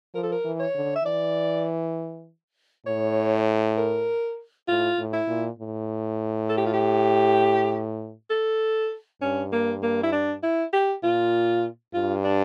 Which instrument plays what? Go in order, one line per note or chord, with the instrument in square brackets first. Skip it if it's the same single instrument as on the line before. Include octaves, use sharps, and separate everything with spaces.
[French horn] F3 [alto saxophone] A#4
[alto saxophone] A4
A#4
[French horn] E3
[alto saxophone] C#5
[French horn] D3
[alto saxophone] E5
[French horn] E3 [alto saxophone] D5
[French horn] A2 [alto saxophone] C#5
[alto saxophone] A#4
[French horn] A2 [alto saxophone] F4
[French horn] A2
[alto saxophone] E4
[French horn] A#2
A2
[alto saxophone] A4
G4
F4
G4
A4
[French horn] G2 [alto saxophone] C#4
[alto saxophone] A#3
A#3
E4
D4
E4
G4
[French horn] A#2 [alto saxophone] F4
[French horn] G2 [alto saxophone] F4
[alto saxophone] D4